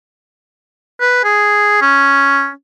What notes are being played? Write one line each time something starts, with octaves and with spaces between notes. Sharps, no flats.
B4
G#4
C#4